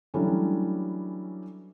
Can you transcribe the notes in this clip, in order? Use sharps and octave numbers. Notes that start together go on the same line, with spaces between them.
E3 F#3 G3 A3 C#4 D4